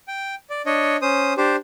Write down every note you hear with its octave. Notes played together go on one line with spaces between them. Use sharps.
G5
D5
D4 C#5 D#5
C#4 C5 D#6
D4 G4 C5